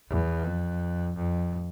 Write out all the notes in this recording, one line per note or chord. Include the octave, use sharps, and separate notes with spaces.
E2
F2
F2